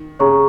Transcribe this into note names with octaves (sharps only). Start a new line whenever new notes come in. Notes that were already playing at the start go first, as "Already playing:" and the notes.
Already playing: D#3
C#3 G#4 C#5 A#5 C#6